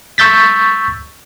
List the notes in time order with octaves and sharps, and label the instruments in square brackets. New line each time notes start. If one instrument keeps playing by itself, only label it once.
[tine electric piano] C#6 E6 G6 A6 B6